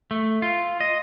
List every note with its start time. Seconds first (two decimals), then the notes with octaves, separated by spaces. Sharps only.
0.11 A3
0.42 F4
0.80 D#5